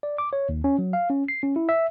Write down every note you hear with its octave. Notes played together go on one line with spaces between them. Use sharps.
D5
D6
C#5
D#2
C#4
F#3
F5
C#4
C7
C#4
E4
E5